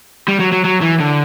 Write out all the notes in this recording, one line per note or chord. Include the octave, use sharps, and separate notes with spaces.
G3
F#3
F#3
F#3
E3
D3